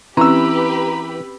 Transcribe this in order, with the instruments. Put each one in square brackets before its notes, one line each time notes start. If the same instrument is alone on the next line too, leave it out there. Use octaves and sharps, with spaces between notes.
[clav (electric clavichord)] E3 [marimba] C4 C#4 [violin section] G4 B4 B5 [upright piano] A#5 E6